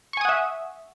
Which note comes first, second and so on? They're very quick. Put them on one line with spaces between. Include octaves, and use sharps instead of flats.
C#6 G#5 D#6 F#5 E5